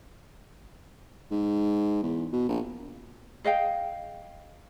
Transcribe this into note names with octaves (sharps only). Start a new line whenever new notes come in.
G#2
E2
B2
A#1
G#4 D#5 F5 G5